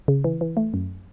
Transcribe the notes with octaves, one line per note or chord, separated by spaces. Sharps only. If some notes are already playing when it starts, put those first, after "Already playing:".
C#3
E3
E3
A3
F#2